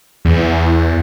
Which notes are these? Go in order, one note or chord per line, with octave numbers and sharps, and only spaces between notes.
E2